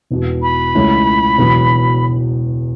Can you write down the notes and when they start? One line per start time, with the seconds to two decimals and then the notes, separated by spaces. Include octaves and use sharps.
0.11 E1 E2 B2
0.42 B5
0.75 C#2 C#3 A3 C#4 E4
1.38 E1 E2 B2 F#3